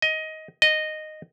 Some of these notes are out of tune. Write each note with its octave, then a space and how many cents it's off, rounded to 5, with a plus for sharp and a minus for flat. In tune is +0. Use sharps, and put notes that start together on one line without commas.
D#5 +15
D#5 -10